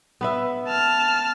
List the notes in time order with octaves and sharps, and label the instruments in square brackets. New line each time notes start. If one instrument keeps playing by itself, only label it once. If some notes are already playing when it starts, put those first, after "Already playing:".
[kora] B3 B4 E5
[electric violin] A5 F6